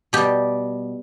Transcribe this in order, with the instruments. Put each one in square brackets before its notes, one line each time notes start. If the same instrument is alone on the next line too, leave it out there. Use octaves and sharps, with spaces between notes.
[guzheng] B2 G3 G4